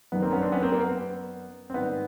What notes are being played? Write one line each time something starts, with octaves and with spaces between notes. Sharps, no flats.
F#2 D#3 G3 A#3 B3
A#3 C4
B3 C#4
C4 D4
B3 C#4
A#3 C4
A#3
B3
C4
G#2 D#3 G3 B3